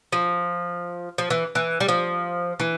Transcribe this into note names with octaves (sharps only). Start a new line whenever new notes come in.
F3
F3
E3
E3
G3
F3
E3